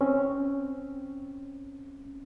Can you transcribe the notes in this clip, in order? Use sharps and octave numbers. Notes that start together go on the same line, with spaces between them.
C4 C#4